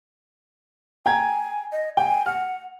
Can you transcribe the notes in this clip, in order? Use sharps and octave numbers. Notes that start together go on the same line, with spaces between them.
G5 G#5 A#5 G#6
D#5
G5 G#5
F#5 F6